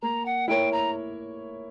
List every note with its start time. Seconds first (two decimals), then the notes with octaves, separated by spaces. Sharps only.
0.02 A#3 A#5
0.25 F#5
0.48 E4 A#4 C#5 G5
0.71 A#5